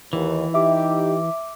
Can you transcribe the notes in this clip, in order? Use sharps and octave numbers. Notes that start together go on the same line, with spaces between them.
D#2 E3
D#4 G4 E5 D6